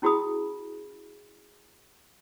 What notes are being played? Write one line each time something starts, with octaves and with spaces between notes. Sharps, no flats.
C#4 E4 F#4 G#4 B5 D#6